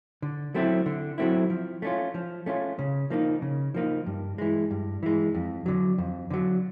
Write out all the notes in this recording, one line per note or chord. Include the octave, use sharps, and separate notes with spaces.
D3
F#3 A3 C4 E4
D3
F#3 A3 C4 E4
F3
A3 C#4 F4
F3
A3 C#4 F4
C#3
F3 A#3 D#4
C#3
F3 A#3 D#4
G2
E3 G#3
G2
E3 G#3
F2
D3 F#3
F2
D3 F#3